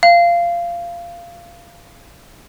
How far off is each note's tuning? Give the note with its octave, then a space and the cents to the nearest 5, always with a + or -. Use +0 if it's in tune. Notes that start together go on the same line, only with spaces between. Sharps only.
F5 -15